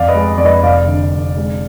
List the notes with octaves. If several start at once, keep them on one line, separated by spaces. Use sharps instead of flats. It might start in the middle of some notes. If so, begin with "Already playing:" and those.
Already playing: F2 D5 F5
B4 D#5
G#3
F2 D5
B4 D#5
F1 D5 F5
D3
F1
G#3